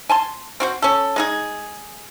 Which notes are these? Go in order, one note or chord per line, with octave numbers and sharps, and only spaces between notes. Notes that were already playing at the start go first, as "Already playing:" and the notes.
G#5 A5 C6
C4 F#4 C5
C#4 A4
G#3 D#4 G#4